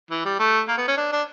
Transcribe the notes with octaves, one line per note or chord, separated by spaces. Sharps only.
E3
G3
A3
A#3
B3
C#4
D4
D4